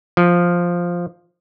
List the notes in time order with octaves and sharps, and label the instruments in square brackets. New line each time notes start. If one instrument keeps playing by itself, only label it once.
[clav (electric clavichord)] F3